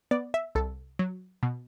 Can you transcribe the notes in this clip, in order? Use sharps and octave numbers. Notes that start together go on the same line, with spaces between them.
B3 D5
E5
C2 A4
F#3
B2